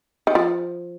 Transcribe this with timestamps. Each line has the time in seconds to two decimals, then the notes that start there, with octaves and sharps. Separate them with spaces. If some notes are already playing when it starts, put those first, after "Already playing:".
0.27 D#3
0.35 F3